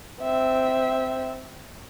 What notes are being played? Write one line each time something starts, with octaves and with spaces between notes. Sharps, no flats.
C4 E5